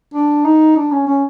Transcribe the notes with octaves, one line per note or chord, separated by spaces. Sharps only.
D4
D#4
D4
C#4
C#4